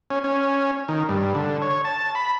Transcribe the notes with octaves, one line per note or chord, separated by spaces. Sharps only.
C#4
C#4
D#3
G2
D3
C#5
A5
B5